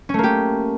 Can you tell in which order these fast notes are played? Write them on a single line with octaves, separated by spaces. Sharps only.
C#4 A3 A#3 G4